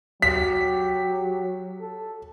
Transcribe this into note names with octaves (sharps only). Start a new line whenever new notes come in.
F#3 G4 B6
A4